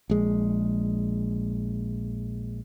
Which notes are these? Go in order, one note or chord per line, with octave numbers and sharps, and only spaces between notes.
A#1 G#3